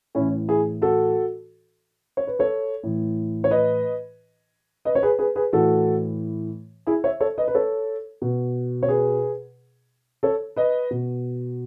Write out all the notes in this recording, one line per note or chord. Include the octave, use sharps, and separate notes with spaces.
A2 E3 C#4 E4
E4 G#4
F#4 A4
C#5
B4
A4 C#5
A2 E3
C#5
B4 D#5
B4 D#5
C#5
G#4 B4
G#4 B4
G#4 B4
A2 E3 F#4 A4
E4 G#4
C#5 E5
A4 C#5
B4 D#5
B4
A4 C#5
B2
C#5
G#4 B4
A4 C#5
B4 D#5
B2